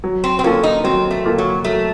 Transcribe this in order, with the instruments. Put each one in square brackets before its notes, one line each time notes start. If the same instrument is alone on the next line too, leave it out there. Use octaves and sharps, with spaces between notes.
[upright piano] F#3
[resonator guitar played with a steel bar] C4
C4
[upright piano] A#3 F4 A4 [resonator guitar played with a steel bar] C#4
[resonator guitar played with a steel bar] D#4
[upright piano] F#3 [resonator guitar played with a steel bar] C4
[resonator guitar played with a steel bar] A3
[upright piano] A#3 F4 A4
[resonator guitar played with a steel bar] F#3
[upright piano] F#3 [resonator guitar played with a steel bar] A3